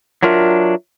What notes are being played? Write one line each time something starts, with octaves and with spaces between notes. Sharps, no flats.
F#3 D4 F4 A#4 E5